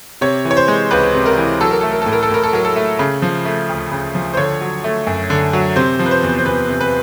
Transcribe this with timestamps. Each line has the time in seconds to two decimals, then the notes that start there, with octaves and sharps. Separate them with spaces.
0.21 C3 C#5
0.45 E3
0.51 C#5
0.57 C5
0.68 G#3
0.91 C#2 B4
1.14 C3
1.26 A#4
1.37 E3
1.61 F#3 A4
1.71 A#4
1.81 A3 A4
1.92 A#4
2.02 A2 A4
2.13 A#4
2.23 A4
2.30 A2 A#4
2.43 A4
2.53 F#3 A#4
2.65 A4
2.76 A3
2.99 C#3
3.22 F3
3.45 A3
3.69 D2
3.92 C#3
4.15 F3
4.34 C5
4.37 D3 C#5
4.61 F#3
4.84 A3
5.07 F#2
5.30 D3
5.53 F#3
5.76 C3 C5
5.99 F3
6.06 B4
6.11 C5
6.23 E2
6.39 C5
6.45 E2 B4
6.69 C3
6.81 B4